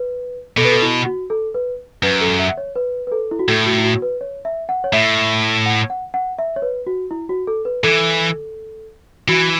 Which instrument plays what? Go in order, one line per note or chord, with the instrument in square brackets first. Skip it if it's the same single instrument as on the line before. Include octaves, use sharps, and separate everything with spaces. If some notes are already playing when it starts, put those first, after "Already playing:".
Already playing: [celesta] B4
[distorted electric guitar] B2 [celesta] A4
[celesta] B4
A4
E4
F#4
A4
B4
[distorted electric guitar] F#2 [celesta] B4
[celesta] A4
E5
C#5
B4
B4
A4
E4
F#4
[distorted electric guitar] A2 [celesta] A4
[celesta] F#4
E4
F#4
B4
C#5
E5
F#5
C#5
[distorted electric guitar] A2 [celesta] E5
[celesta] F#5
F#5
F#5
E5
C#5
B4
F#4
E4
F#4
A4
B4
[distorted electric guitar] E3 [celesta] A4
[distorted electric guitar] E3 [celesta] F#4